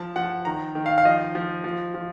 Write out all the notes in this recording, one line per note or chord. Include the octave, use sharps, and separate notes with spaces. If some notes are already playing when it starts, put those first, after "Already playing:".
Already playing: F3 A5
F3 F#5
D#3 A#5
D#3
F5
F5
F3 D#5
F3
F3
F3